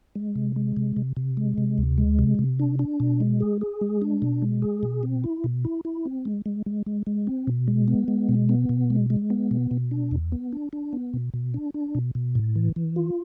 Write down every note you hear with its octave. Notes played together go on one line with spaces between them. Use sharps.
G#3
C3
G#3
C3
C3
C3
G#3
C3
D2
G#3
C3
C3
D4
D4
B2
G#3
G#4
G#4
G#3
D4
B2
G#3
G#4
B2
C4
E4
B2
E4
E4
C4
G#3
G#3
G#3
G#3
G#3
C4
B2
G#3
B3
G#3
B2
B3
B2
G#3
G#3
B3
B2
B2
D4
E2
B3
D4
D4
B3
B2
B2
D4
D4
B2
B2
A2
E3
E3
F4